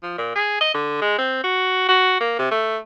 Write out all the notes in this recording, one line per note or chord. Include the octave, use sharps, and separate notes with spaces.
F3
A#2
G#4
D#5
D3
G#3
C4
F#4
F#4
A#3
C3
A3